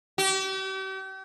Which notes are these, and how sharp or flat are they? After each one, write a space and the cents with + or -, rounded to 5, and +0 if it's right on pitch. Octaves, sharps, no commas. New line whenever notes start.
G4 -40